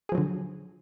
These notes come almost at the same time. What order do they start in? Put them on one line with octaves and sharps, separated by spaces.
G#4 F3 F#3 D3